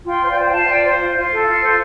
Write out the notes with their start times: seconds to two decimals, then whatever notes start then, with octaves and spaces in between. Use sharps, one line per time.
0.05 F4 G5 C6
0.21 C5
0.28 D5 G5
0.37 C5
0.45 G5
0.51 F4 F5 A5
0.63 F5
0.67 C5 D5 G5
0.83 C5
0.99 F4
1.15 F4
1.30 A4
1.45 F4
1.61 C5